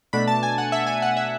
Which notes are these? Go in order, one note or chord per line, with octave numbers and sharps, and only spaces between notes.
B2 A3 D4 B5
A5
G#5
F#5
E5
G#5
F#5
E5